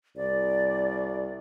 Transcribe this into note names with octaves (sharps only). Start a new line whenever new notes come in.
C2 D5